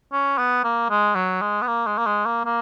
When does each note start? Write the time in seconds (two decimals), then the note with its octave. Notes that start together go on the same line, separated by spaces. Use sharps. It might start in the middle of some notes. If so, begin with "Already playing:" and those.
0.13 C#4
0.38 B3
0.64 A#3
0.90 G#3
1.15 F#3
1.41 G#3
1.62 B3
1.67 A#3
1.87 G#3
1.98 A#3
2.06 G#3
2.26 A#3
2.45 A#3